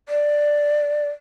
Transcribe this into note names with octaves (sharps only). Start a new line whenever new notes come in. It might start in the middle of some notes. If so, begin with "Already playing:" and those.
D5